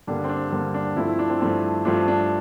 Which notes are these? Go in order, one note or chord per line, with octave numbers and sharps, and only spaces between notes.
G2 D3 G3 A#3 D4
C4
D4
G2 D3 G3 A#3 C4
D4
G2 F3 A3 C4 E4
E4
D4
C4
G2 F3 A3 C4
G2 F3 A3 C4 D4
D4